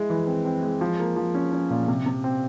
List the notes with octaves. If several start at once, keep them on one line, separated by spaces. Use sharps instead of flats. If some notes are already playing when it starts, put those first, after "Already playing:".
Already playing: G#3 E4
E3
C4
C4
G#3
F3
A#3
F3
C#4
C#4
A#2
C3
C3
C4